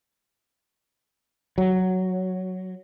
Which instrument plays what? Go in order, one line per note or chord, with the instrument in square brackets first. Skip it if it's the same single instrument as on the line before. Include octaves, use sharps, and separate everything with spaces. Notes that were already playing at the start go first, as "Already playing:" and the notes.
[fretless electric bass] F#3